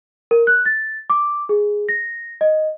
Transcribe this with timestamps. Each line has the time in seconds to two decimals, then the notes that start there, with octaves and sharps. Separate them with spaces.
0.31 A#4
0.47 F#6
0.66 A6
1.10 D6
1.49 G#4
1.89 A#6
2.41 D#5